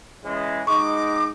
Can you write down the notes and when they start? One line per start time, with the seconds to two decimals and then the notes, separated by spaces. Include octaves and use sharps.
0.24 C#3 E3 G#3
0.67 G#3 D#4 F#4 C#6 D6